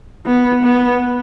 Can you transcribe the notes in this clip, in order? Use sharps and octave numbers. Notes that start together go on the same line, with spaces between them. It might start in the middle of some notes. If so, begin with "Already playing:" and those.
B3
B3